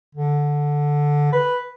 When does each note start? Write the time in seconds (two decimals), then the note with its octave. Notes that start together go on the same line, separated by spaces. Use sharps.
0.15 D3
1.32 B4